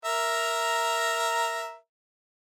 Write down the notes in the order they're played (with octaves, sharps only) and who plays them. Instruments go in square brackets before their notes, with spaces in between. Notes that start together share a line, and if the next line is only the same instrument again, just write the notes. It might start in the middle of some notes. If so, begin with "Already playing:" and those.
[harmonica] A#4 E5 A#5